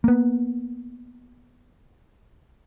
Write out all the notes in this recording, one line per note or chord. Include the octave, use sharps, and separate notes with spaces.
A#3 B3